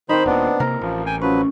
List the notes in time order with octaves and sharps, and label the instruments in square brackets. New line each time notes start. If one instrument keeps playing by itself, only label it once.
[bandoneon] D#3 C5 B5 [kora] C4 D#4
[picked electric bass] D#1 A#2 [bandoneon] B3 D4
[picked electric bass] C3 A#3 [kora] A#4
[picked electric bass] A1 [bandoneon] F3
[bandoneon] G5 G#5
[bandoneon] F3 F#3 B4 [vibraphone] C#4